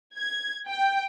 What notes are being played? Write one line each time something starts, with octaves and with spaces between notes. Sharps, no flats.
G#6
G5